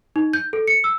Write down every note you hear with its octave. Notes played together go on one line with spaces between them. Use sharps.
D#4
G6
A4
C#7
E6